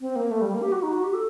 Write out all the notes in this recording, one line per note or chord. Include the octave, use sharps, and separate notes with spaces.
C4
A#3
A3
G3
A#3
G4
F#4
D#4
F#4
G4
A4